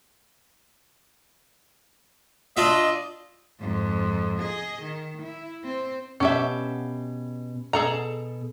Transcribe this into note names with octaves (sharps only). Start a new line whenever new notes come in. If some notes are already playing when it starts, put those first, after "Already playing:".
D4 F4 D#5 E5
F2 G#2
G#4 D#5
D#3
E4
C4 C5
B2 C#4 G4 E5 F#5 A5
B2 G#4 A4 A#5